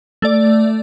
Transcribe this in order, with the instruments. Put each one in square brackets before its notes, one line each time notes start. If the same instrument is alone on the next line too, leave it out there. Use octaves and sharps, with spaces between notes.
[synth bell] A3 D5